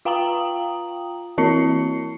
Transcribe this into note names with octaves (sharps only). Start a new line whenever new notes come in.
F4 F5 G5 A#5 D#6 F#7
E3 C4 E4 C7 C#7